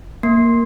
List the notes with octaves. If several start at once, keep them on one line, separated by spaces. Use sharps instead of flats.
A#3